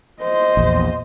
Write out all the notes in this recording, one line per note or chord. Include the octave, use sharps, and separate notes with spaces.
C5 D#5
A#1 E2